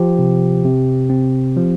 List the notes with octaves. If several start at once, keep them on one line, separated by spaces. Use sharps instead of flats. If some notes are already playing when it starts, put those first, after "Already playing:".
Already playing: F3 G4
C3
C3
C4
F3